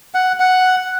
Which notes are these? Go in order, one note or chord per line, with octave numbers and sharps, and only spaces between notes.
F#5
F#5